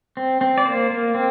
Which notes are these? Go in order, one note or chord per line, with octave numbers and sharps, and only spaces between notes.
C4
C4
D5
A#3 C5
A#3
C4